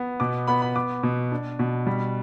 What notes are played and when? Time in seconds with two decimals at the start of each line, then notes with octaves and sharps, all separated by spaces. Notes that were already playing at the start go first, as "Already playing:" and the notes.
Already playing: B3
0.20 B2 D6
0.47 B3 B5
0.62 B5
0.76 B3 D6
1.03 B2
1.32 D4
1.59 B2
1.87 G3